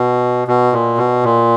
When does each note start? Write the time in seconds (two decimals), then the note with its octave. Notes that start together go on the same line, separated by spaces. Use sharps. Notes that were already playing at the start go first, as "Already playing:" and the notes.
Already playing: B2
0.48 B2
0.73 A#2
0.98 B2
1.23 A#2